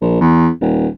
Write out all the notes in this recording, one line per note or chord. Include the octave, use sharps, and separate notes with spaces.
A#1
E2
D#1